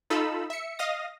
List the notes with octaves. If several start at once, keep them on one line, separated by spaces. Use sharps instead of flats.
D#4 F4 A4 B5 E6
E5 C#7
D#5 F5 D#6 A#6